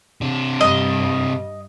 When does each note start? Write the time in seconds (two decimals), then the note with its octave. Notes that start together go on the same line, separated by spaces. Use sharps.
0.21 C3 D4
0.61 G2 G3 D#5